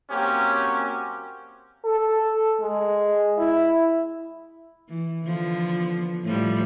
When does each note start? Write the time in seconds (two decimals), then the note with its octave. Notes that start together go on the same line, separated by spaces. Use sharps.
0.10 F#3 A#3 C4 C#4 F#4 G4
1.85 A4
2.60 G#3
3.38 E4
4.89 E3
5.25 D3 F3 B3
6.24 A2 F3 G3